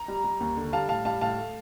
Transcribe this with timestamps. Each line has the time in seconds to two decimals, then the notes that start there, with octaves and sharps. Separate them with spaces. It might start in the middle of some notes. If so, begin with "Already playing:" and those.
Already playing: A#5
0.08 G3
0.24 G3
0.40 D#2
0.57 D3
0.73 G3 F5 A5
0.89 A2 F5 A5
1.05 G3 F5 A5
1.21 A2 F5 A5
1.38 A3